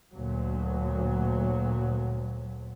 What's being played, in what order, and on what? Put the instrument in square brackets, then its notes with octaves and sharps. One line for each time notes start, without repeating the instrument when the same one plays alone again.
[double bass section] D2 A#2 F#3